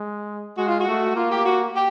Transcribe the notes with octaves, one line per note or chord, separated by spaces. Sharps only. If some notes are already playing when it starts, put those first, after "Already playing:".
Already playing: G#3
G#3 F#4
F4
F#4
A3
A#3 F4
G4
F#4
G4